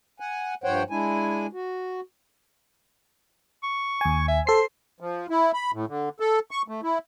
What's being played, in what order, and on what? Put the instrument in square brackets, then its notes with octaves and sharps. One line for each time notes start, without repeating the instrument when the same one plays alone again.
[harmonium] F#5 G#5
G2 F3 C5 C#5 F#5 G5
G#3 D4 E4 G#5
F#4
[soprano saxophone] C#6
[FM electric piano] D#2 G#5
[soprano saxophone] E5
[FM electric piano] A4 C7 [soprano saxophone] C5
[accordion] F3
E4
B5
A2
D3
A4
C#6
A3
E4